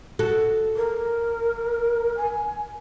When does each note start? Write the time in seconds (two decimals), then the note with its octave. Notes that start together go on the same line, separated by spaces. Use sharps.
0.19 F#4 A4
0.75 A#4
2.17 G#5